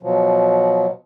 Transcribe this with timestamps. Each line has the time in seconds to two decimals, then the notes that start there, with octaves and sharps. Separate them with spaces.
0.03 B2 F3 F#3